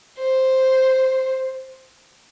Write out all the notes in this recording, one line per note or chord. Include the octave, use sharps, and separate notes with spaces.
C5